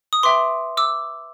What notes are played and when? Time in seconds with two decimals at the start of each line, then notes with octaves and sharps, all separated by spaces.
0.13 D#6
0.23 B4 E5 G5 C6 D6
0.77 D6 E6